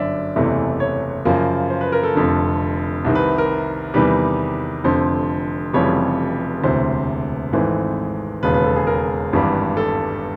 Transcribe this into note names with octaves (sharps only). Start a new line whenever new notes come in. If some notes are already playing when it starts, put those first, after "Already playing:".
Already playing: G1 F#2 D3 F#3 D5 E5
F#1 E2 C3 E3 A3
C#5
F#2 C#3 F3 A#3
C5
B4
A#4
A4
F1 F2 D3
C2 C3 D#3
B4
A#4
E2 C3 D#3 G3 B4
F1 F2 D3 C5
F1 F2 C#3 E3 G3 C#5
E1 D2 C3 E3 C5
G#1 G#2 E3 A3 C4
E1 D#2 C#3 B4
B4
A4
G#4
A#4
G#1 G2 E3 G3
A4